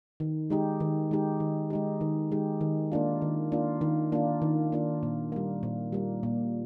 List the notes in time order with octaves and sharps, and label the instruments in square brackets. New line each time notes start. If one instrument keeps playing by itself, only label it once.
[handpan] D#3
G#3 D#4 G4
D#3
G#3 D#4 G4
D#3
G#3 D#4 G4
D#3
G#3 D#4 G4
D#3
A#3 D4 F4
D#3
A#3 D4 F4
D#3
A#3 D4 F4
D#3
A#3 D4 F4
A#2
G3 A#3
A#2
G3 A#3
A#2